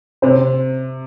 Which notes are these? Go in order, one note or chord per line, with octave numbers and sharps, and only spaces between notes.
C3 C5